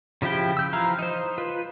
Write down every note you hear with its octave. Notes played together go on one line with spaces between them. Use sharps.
C#3 F3 E4 G4 G5
E6 G6
E3 F3 E4 F5 A#5
D#4 C5
F4 B4